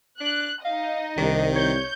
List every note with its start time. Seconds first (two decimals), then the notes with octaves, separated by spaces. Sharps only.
0.21 D4 F#6
0.65 D#4 D#5 F5
1.18 C2 D#3 D4
1.55 C#5 G6